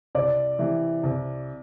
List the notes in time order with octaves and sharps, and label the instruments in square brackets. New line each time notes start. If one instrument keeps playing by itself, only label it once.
[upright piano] C2 [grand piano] D5
[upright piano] C3 E3
C2